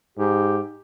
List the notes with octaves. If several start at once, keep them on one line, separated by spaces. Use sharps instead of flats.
G#2 G4